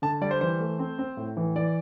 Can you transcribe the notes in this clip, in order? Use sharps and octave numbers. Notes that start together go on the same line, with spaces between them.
D3 A5
G3 D5
C5
E3 C5
A3
C4
C4
A2
E3
E3 D5